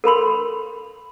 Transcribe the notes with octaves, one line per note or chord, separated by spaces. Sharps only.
A4 A#4 B5 C6